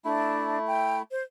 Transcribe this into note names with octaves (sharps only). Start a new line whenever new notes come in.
A3 D4 E4
G5
C5